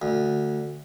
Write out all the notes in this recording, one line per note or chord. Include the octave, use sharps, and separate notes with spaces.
D2